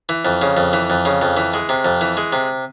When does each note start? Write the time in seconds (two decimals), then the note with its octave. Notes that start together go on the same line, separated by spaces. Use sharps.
0.09 E3
0.25 F2
0.42 C#3
0.57 F2
0.73 E3
0.90 F2
1.05 C#3
1.22 F2
1.37 E3
1.54 G#3
1.69 C3
1.85 F2
2.01 E3
2.17 G#3
2.33 C3